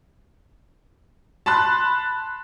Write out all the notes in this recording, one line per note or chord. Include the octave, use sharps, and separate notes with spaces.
A5 B5 C6 F#6